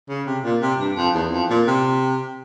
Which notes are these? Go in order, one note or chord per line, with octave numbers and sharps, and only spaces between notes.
C#3
C3
A#2
C3
G2
F2
E2
F2
A#2
C3